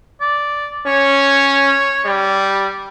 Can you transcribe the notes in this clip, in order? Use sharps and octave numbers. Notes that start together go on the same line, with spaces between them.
D5
C#4 C#5
G3